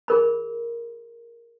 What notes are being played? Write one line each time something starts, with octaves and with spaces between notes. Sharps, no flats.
G#4 A#4 B5